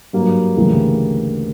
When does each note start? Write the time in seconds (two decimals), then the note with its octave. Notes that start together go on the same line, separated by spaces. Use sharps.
0.13 G2 F#3 A#3
0.57 D2 C#3 E3 G3 A#3